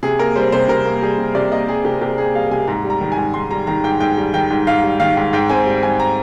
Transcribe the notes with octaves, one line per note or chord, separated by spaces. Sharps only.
C3 G#4
A#3 A#4
G3 C5
C3 C5
C3 A#4
A#3
G3 G#4
C3
C3 D5
A#3 D#5
G3 G#4
C3 G4
C3 G4
A#3 G#4
G3 F5
C3 G#5
G#2 A#5
G3
A#5
D#3
G#5
G#2
G#2 C6
G3 A#5
D#3 A#5
G#2 G5
G#2 G5
G3
D#3 G5
G#2
G#2 F5
G3
D#3 F5
G#2
G#2 G5
C4 G#5
G3
G#2 G#5
A#5